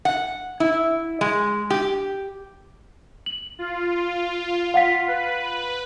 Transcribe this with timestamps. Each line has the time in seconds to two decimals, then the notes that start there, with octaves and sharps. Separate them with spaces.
0.05 F#5
0.60 E4
1.21 G#3
1.70 G4
3.26 F#7
3.59 F4
4.74 F5 F#5 B6
5.08 B4